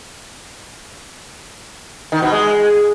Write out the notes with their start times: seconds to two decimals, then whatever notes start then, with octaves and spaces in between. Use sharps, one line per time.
2.12 D#3
2.22 B2
2.32 G#3